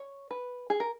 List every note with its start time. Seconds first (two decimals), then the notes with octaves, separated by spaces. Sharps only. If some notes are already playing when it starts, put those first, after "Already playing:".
Already playing: C#5
0.31 B4
0.70 G#4
0.80 A#4